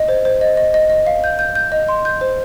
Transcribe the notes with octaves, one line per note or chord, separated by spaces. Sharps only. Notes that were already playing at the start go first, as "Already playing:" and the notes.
Already playing: D#5
C5
C5
D#5
D#5
D#5
D#5
F5
G6
G6
G6
D#5
C6
G6
C5